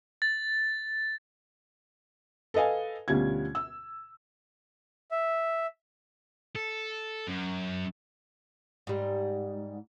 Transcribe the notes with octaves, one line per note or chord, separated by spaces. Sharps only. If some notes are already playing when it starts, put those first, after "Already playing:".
A6
A4 B4 D#5 F5 G#5
D2 B2 G3 C#4 F4 G#6
E6
E5
A4
F#2
G#2 G3